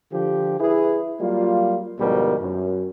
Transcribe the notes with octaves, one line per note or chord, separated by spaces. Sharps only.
D3 F3 G4
E4 G#4 B4
F#3 G3 A#3 F4
D2 G#2 B2 F3 G3 A#4
F#2